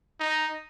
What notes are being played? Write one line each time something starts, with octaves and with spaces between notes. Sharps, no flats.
D#4